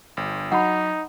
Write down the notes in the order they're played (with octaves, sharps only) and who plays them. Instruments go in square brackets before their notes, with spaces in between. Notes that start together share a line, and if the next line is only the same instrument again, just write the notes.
[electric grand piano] G1
[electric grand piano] F#3 [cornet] D#4 [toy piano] F#5 B5